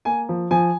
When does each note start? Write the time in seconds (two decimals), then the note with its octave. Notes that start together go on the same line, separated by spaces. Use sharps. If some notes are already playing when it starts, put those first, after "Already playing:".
0.05 A#3 G#5
0.29 F3
0.51 F3 G#5